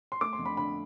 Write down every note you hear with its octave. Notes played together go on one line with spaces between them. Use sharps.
C6
A3 D6
C6
F2
B5
D3 B5